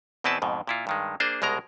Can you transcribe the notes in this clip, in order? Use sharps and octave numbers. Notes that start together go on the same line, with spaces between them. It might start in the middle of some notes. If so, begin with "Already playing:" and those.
E2 B2 C4 E4 B4 A5
F2 G#2 B2
A#2 E4 F4
G2 D#3 G#3
A#3 D4 G#4 C5
C2 B2 G#3 A#4 A#5